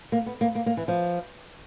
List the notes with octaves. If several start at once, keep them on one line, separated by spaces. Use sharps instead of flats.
A#3
B3
A#3
A#3
A#3
E3
F3